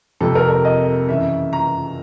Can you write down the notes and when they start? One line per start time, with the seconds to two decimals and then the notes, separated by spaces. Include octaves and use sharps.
0.21 F2 C3 F3 A4
0.35 A#4
0.50 A#4
0.65 D#5
1.09 F#2 C#3 E3 E5
1.53 A#5